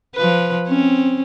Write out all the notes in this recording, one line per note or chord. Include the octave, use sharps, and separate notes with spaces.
F3 B4
C4 C#4